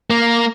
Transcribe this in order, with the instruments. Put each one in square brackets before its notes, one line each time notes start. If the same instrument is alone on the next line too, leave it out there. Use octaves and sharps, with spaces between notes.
[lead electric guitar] A#3